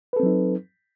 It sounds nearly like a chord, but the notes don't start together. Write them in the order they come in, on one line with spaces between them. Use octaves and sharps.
B4 A4 C4 F#3 D#4